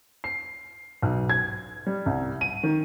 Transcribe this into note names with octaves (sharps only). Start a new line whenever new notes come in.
C7
B1
G#6
G3
C2
D#7
D#3